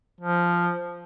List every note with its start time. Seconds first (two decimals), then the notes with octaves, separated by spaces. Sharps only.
0.21 F3